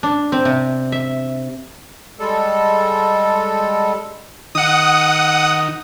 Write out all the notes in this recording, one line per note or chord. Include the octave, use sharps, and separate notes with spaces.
D4
C4
C3
E5
G3 G#3 A4
D#3 D#4 F#5 D#6